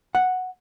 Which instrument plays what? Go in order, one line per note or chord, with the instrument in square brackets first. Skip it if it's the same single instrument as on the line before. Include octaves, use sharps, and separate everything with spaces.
[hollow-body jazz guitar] F#5